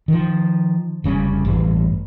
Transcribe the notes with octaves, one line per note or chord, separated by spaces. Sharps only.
D#3 F3
F1 C#3 G3 C#4
A1 G2